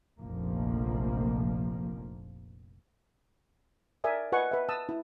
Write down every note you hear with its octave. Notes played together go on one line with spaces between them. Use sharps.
F1 A#1 F3 A#3
A#4 D5 E5 G#5 D#6
F4 B4 D#5 F#5 G#5 C#6
B4 E5
A5 D#6 E6
E4